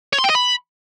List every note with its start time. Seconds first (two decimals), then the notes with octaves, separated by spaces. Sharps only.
0.13 C#5
0.19 C6
0.24 G5
0.30 D#5
0.35 B5